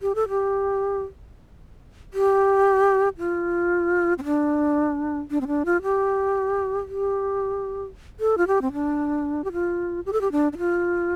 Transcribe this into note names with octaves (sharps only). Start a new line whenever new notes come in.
G4
A4
G4
G4
F4
C4
D4
D4
C4
D4
F4
G4
G4
A4
F4
G4
C4
D4
G4
F4
G4
A4
G4
D4
D4
F4